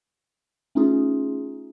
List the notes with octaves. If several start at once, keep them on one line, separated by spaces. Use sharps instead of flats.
A3 C#4 D#4 F4 G#4